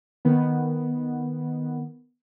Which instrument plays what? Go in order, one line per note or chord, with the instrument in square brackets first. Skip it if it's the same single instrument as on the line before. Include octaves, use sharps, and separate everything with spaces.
[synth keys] D#3 B3